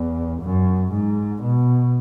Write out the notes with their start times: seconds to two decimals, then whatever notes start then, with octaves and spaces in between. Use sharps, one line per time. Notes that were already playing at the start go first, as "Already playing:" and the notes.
Already playing: E2
0.42 F#2
0.92 G#2
1.43 B2